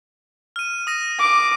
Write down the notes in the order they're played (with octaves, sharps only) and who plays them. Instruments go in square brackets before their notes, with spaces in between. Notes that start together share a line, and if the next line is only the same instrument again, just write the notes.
[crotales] F6 D#7
D#6 A#6 D#7
[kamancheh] D6